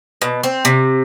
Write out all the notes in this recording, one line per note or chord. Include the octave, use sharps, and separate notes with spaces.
B2
C4
C3